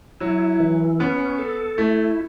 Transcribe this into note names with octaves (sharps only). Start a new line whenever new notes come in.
F#3 E4
E3
B3 C#4
A4
A3 E4